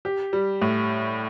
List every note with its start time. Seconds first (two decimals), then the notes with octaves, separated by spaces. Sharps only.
0.05 G4
0.33 G3
0.62 A2